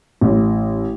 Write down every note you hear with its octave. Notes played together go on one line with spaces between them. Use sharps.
A1